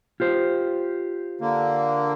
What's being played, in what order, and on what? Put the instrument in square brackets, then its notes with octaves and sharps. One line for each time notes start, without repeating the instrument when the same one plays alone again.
[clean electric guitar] F4 G4 C5
[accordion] D3 A#3